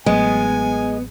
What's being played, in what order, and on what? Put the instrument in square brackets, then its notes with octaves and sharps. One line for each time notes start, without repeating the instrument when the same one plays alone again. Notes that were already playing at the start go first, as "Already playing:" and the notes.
[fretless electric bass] A1 F#3 A3 [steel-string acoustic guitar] G#3 [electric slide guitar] B3 [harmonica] G#5